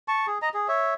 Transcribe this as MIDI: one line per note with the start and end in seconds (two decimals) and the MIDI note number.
0.08 0.27 81
0.08 0.27 85
0.27 0.38 68
0.42 0.49 75
0.42 0.49 82
0.54 0.68 68
0.68 0.94 73
0.68 0.94 76